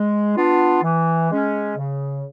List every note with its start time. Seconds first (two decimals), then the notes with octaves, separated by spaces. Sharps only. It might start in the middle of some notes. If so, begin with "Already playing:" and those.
Already playing: G#3
0.36 B3 D4 F4
0.83 E3
1.30 G#3 C#4
1.77 C#3